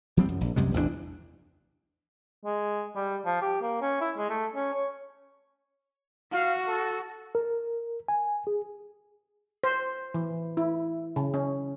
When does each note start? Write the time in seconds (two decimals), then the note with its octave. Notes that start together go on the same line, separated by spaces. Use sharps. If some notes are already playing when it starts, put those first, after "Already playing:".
0.17 F3 G3 C4
0.29 F#2
0.41 A#1
0.56 C2 F#2 C3 G#3
0.74 A1 E2 G2 D4
2.45 G#3
2.96 G3
3.25 F3
3.42 G4
3.62 A#3
3.82 C#4
4.01 E4
4.17 G#3
4.30 A3
4.55 C#4
4.74 C#5
6.32 F#4 F5
6.67 A4
7.35 A#4
8.08 G#5
8.47 G#4
9.64 C5
10.14 E3
10.57 E4
11.16 C#3
11.34 C#4